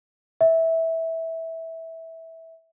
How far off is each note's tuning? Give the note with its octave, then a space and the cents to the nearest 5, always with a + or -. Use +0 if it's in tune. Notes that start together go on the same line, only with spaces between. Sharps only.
E5 -15